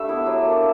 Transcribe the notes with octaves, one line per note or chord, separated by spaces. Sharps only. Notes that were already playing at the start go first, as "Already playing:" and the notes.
Already playing: G3 A3 D4 E5
B3 E4
F#3
A#3 D4